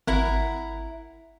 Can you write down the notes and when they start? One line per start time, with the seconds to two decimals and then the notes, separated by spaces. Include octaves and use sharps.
0.07 G#1 E4 A#4 F#5